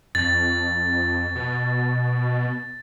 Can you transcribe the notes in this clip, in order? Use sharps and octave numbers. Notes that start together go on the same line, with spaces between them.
F2 A6
B2